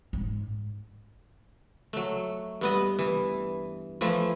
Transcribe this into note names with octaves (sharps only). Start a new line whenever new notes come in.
G#2
F#3 A3
G2 B3 D#5
E3
E3 F3 A3